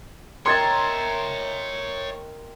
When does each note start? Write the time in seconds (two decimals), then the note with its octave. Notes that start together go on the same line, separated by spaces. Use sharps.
0.46 A#4 C#5 D#5 E5 G5 C6 G#6 A6